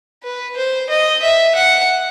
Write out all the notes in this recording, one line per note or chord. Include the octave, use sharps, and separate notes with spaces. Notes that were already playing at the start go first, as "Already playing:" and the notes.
B4
C5
D#5
E5
F#5